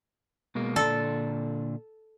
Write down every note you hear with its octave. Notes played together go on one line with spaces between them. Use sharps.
B2 G#3 A#3
A#2 D3 A4 D5